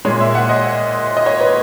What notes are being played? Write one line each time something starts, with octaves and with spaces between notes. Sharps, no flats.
A#2 G#3 C#5
E5
F#5
D#5
D#5
C#5
B4